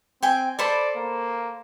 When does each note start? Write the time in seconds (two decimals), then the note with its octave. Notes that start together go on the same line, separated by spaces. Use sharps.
0.23 C4 G5 G#5
0.59 A4 C5 D5 B5
0.96 A#3